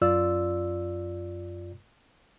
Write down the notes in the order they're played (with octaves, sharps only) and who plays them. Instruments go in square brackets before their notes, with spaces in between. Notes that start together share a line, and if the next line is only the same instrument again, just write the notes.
[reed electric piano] F#2 F4 D5 E6